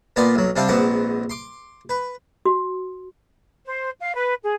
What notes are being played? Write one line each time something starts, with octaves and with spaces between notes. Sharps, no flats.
A#2 B3 F4 D5 G#5 C6
B1 F#3
C3 G3 C4 D4 F5 G5
A#1 G#2 B3 C4 F#5 D6
C6 D6
B4
F#4
C5
F5
B4
G#4